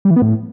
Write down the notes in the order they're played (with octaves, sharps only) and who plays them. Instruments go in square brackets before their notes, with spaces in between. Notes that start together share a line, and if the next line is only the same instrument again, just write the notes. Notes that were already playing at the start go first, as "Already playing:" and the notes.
[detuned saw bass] G3
E3
B3
A2